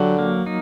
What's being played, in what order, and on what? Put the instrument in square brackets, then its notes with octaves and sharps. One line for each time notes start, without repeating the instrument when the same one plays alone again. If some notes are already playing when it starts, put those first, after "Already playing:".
Already playing: [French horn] D3 [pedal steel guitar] F#3 G4
[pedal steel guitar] A#3
D#4